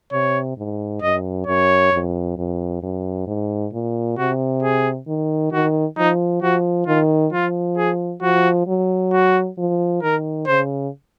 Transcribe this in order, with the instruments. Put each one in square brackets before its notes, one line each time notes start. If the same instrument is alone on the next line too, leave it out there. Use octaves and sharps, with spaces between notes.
[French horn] C3 [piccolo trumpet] C#5
[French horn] G#2
[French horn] F#2 [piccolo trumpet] D#5
[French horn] F#2 [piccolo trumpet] C#5
[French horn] F2
F2
F#2
G#2
A#2
[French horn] C3 [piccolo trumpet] F#4
[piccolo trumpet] G#4
[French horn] D#3
[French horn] D#3 [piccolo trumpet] F#4
[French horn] F3 [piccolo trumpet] D#4
[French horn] F3 [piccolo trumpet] F#4
[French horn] D#3 [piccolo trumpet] F4
[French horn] F3 [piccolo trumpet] F4
[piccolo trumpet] G#4
[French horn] F3 [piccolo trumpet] F#4
[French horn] F#3
[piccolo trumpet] F#4
[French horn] F3
[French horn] D#3 [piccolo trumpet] A#4
[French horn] C#3 [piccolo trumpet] C5